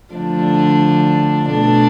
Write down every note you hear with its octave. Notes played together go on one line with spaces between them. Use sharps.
D3 F3 A3 D4
B2 A3 D4